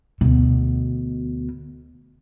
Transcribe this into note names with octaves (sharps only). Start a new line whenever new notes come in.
D2 B2